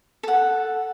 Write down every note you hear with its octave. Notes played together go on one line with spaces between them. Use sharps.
A4 F#5